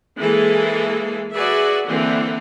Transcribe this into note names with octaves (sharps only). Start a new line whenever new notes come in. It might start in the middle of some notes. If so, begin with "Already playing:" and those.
E3 G#3 A#3 G#4 A4
F#4 G#4 B4 D5 E5
D3 E3 A#3 C4 A4